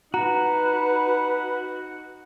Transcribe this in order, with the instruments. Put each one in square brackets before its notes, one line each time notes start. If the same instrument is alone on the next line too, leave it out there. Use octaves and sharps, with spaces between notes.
[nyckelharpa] D#4 F#5 [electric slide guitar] F#4 [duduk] B4 [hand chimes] A#5